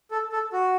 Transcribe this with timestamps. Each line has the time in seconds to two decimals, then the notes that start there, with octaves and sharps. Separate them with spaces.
0.11 A4
0.32 A4
0.53 F#4